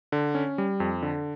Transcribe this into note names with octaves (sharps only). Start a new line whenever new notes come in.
D3
C#4
G3
F2
D3